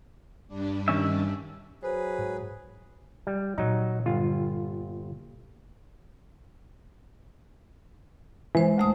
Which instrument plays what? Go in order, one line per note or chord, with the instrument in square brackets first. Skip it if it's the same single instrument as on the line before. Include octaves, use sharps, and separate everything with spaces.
[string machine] G2 G3 D4
[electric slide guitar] D#3 C#4 E5
[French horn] F#3 [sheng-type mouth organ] G#4 B4 [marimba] C5
[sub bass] G#2
[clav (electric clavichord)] G3
[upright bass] A#2 [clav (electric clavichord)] F#3 D#4
[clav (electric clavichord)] G1 F4
[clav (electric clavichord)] E3 [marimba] G#3 C5
[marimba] D2 A3 D#6